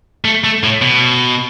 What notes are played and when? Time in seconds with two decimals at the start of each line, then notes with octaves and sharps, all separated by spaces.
0.25 A3
0.44 A3
0.63 A2
0.82 B2